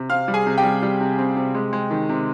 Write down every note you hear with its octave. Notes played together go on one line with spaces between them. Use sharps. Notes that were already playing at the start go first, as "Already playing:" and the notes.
Already playing: C3
C4 F5 F6
G3
G#4 G#5
C3
G4 G5
G3
G3
C3
C4
C3
G#3
G#3
D#3
C3